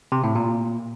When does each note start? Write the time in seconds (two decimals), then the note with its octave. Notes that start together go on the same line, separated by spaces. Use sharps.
0.12 C3
0.24 A2
0.35 A#2